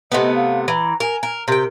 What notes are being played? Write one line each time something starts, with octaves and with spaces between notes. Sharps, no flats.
C3 A3 B3 D#5
F5
E3 A#5
A#4 G#5
A#4
C3 A#4 G5